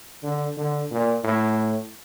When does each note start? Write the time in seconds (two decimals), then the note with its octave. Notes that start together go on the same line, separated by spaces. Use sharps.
0.23 D3
0.57 D3
0.91 A#2
1.24 A2